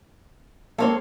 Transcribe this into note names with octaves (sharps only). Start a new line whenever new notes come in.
A#3 C4 A4 C#5 C6